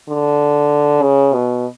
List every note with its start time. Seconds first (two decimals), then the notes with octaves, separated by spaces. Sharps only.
0.09 D3
1.02 C#3
1.34 B2